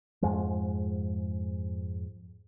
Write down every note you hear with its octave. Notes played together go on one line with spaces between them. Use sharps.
F2 G#2 F3 G#3